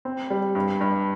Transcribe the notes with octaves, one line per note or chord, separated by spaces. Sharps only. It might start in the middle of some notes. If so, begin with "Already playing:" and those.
C4
G3
G2
G2